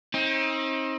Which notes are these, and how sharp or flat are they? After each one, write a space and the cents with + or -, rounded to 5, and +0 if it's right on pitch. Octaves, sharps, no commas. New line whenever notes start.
C4 +40 D#4 +30